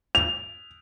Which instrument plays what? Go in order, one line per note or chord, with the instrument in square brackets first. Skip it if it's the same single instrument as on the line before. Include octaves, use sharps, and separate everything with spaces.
[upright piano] F7